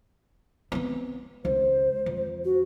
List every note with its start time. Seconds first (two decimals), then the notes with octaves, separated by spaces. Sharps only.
0.72 B3 C4
1.45 C#2 C5
2.06 F2
2.45 F#4